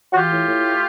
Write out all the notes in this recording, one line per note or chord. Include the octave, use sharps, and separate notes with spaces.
F#4
E3 F4 G4
A2
A2
A3